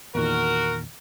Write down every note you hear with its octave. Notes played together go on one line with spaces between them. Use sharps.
E2 A#2 D#3 F#4 A#4